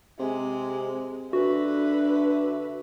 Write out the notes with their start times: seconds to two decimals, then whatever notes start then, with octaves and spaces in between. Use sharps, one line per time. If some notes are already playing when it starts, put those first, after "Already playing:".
0.19 C3 G#3
1.33 D3 F#4 B4 E5